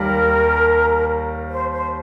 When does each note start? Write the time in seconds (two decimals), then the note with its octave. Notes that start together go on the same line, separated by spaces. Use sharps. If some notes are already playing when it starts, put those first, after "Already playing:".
Already playing: D#2 D#3 G3 A#4
1.51 C5
1.72 C5